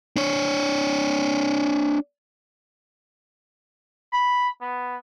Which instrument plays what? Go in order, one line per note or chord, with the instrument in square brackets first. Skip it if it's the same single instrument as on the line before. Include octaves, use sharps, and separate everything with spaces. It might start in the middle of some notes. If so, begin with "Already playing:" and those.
[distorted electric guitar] D4 C#5
[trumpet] B5
B3